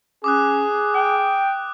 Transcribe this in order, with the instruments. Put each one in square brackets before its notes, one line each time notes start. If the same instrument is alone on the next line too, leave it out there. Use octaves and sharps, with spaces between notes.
[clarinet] C#4 [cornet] G#4 [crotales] D6 D#6 F#6
[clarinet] G5 [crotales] F#6